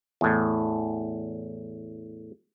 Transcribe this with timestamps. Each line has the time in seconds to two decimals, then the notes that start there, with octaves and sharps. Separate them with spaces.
0.21 E2 A2